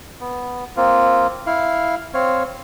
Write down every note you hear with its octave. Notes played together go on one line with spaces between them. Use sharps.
B3
A#3 C4 F4
E4 F5
C4 C#5 F5